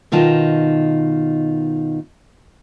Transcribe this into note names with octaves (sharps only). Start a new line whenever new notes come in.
B2 D#3 D#4 F4 A5